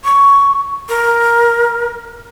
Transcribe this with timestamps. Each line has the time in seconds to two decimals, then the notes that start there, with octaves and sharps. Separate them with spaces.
0.05 C#6
0.89 A#4